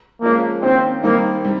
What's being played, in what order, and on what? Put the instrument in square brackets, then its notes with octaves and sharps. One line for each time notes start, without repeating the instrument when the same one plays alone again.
[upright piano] F3 G#3 C#4 [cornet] A#3
[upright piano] D#3 A#3 C#4 [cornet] C4
[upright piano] D#3 G3 C4 D#4 [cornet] A#3
[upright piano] C3 G3